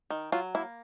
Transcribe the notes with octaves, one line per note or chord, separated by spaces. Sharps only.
D#3
F#3 F4
A#3 E4